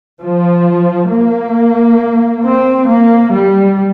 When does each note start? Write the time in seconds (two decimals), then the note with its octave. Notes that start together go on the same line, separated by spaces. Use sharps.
0.23 F3
1.12 A#3
2.45 C4
2.89 A#3
3.34 G3